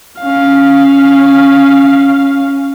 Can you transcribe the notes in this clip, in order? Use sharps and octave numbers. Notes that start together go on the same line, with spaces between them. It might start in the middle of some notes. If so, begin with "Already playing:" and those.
C#4 F5